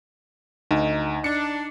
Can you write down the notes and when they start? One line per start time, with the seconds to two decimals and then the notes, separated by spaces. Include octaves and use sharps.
0.71 D2 D#4
1.24 D4 C#7